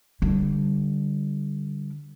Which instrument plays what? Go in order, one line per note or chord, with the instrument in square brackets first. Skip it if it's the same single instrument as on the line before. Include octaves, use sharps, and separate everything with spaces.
[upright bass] D3 G3